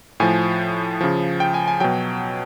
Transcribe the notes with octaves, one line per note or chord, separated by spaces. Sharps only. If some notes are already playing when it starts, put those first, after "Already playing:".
A2 F3 G#5
C#3 F3
G5
G#5
G#5
B2 F#3 G5